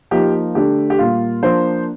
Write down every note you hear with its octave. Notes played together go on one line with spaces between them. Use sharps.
F3 A#3 D#4 G4
D3 A3 D4 G4
G4
A#2 G3 A#3 F4
F3 A#3 D4 C5